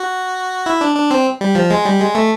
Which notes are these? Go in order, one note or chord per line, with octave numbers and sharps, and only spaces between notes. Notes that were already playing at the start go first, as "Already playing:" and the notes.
Already playing: F#4
E4
D4
D4
C4
G3
F3
G#3
G3
G#3
A3